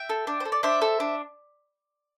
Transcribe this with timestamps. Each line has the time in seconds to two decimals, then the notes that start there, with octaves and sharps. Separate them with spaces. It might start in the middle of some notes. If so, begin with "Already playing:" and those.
Already playing: E5 G5
0.09 A4
0.27 D4
0.40 C5
0.45 A4
0.52 D5
0.63 D4 C5 E5
0.82 A4
1.00 D4